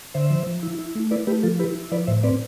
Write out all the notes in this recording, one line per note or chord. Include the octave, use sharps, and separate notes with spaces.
D3 C5 E5
F3
F3
E4
E4
A3
E4 B4 D5
A3 G4 B4
F3 F4 A4
E4 G4 B4
E4
F3 B4 D5
A2 C5 E5
C4 B4 D5